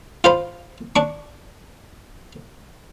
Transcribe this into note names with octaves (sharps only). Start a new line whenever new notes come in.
F4 C5 B5
D4 C#6